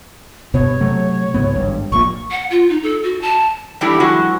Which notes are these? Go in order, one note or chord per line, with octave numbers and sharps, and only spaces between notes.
G2 B2 B3 C#5
C3 F#3 A3
C#2 G#2 B3
G#1 G2
A#1 A#2 C#6
F#5
F4
D#4
A4
F#4
A5
E3 G3 A3 D4 E4 G4
E3 F#3 G#3 F#4